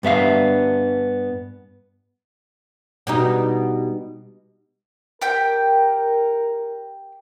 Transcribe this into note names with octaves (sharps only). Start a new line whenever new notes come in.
G2 B3 E5 F5
B2 G3 D#4
G4 A#4 G5